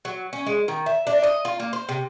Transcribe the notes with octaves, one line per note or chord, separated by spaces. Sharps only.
F#3
C#4
G#3
D#3
E5
D4
D#5
F4
A#3
C5
C3